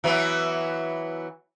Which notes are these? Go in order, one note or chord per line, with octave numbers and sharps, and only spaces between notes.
E3 F#3 B3